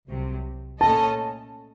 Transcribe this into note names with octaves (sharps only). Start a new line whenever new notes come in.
C2 C3 F#3
A#2 A3 C#4 A4 D#5 A5